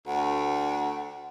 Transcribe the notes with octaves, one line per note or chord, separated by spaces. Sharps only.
D2 F#5
F#5